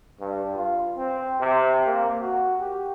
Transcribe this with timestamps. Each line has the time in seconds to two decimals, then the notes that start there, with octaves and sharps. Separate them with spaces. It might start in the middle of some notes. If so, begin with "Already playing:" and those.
0.20 G2
0.55 F4
0.96 C4
1.41 C3
1.86 A#3
2.21 F#4
2.60 G4